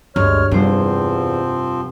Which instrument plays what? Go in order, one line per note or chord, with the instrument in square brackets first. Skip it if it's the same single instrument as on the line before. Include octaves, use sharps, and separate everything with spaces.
[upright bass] D2 [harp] G2 [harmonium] G#3 [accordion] C#5 F6
[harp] F1 C5 [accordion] E2 [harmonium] F3 C4 [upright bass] G3